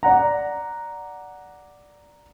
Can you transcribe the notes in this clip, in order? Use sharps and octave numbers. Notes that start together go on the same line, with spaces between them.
D5 F#5 A#5